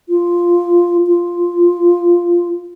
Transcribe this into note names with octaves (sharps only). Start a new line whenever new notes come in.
F4
F4